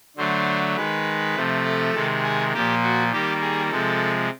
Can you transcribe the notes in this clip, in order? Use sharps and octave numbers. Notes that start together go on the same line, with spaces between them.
D3 F#3 A3 C5
D#3 G#3 B4
C3 F3 A3
A4
C3 D#3 G#3
G#4
A#2 F3 A#3 G4
F#4
D#3 G3 A#3 G4
G#4
C3 F3 G#3 A4